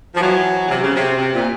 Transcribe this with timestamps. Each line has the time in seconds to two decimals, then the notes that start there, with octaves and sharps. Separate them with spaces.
0.15 F3
0.19 E3 F#3
0.68 C3
0.81 C#3
0.94 C3
1.18 C3
1.33 A#2